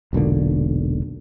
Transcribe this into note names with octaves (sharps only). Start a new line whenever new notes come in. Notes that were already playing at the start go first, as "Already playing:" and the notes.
E1 B1 A#2 D3